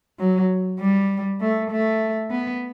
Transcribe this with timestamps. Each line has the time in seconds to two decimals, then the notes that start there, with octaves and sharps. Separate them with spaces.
0.20 F#3
0.80 G3
1.41 A3
1.71 A3
2.31 B3